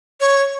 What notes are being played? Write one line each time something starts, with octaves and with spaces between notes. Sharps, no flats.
C#5